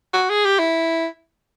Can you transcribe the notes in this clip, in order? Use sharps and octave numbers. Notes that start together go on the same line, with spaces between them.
F#4
G#4
G4
E4